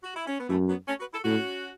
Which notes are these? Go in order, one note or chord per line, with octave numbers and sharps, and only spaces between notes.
F#4
E4
C#4
B3
F#2 E3 A3
F#3 B3
A3 C#4
F#4 B4
E4 A4
A2 C#4 F#4